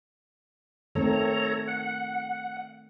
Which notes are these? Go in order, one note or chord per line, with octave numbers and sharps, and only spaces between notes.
D#3 A3 C4 A4 C#5 A#5
F#5